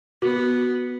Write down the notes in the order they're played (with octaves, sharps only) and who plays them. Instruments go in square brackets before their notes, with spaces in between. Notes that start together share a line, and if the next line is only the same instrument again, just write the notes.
[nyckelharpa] B3 [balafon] F#4